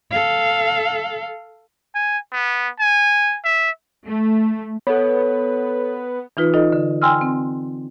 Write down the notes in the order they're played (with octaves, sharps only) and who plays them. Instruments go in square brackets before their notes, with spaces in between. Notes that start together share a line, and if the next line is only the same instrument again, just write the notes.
[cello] A4 F5
[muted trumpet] G#5
B3
G#5
E5
[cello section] A3
[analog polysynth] B3 [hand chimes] A4 C#5
[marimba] E3 D#4 F4 B4
D#4 F4 A4 D#5
D3
G5 G#5 C6 E6 F6
C4